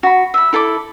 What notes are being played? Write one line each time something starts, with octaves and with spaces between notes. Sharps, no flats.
F#4 B5
E5 B5
E4 A4 B5 D6